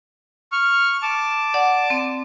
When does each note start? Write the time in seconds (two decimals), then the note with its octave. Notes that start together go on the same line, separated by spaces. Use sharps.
0.52 C#6 F6
1.02 A5 D6
1.54 D5 F#5
1.90 C4